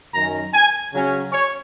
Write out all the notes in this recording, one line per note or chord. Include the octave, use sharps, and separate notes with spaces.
F#2 D#3 F#3 C#4 A#5
G#5
C#3 F#3 C#4
C#5